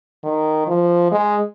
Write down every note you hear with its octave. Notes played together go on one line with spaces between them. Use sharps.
D#3
F3
G#3